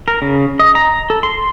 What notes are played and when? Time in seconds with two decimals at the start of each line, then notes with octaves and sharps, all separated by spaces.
0.08 A#4
0.22 C#3
0.59 D#5
0.75 A#5
1.10 A4
1.23 C6